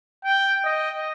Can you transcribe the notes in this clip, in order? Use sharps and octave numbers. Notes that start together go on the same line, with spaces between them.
G5
D#5